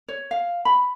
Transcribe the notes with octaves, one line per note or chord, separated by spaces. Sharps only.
C#5
F5
B5